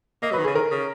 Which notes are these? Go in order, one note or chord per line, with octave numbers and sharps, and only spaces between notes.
A#3 D#5
F#3 B4
D#3
G#4
C#3
D#3 A#4
C#3